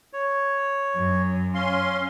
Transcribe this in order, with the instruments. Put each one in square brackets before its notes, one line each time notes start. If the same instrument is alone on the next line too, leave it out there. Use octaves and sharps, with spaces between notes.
[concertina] C#5
[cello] F#2
[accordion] C#4 C6 [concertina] F5